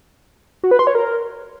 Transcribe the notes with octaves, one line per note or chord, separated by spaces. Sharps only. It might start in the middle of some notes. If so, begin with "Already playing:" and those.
F#4
B4
C6
C#5
A#4